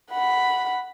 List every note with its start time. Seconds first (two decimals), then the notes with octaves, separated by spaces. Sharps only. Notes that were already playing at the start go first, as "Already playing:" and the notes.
0.11 F#5 B5